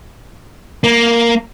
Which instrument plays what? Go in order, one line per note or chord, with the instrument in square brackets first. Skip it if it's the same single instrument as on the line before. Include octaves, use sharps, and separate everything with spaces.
[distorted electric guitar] A#3